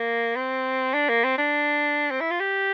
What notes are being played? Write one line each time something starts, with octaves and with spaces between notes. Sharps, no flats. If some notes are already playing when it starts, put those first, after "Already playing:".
Already playing: A#3
C4
D4
A#3
C4
D4
C4
E4
F4
G4